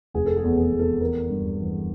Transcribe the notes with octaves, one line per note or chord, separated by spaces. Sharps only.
F1 G#4
A4
G#4
E2
G#4
E2
A4
E3 A#4
G2
E3